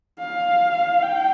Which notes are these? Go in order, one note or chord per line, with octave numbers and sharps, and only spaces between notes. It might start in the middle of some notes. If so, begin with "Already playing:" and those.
F5
G5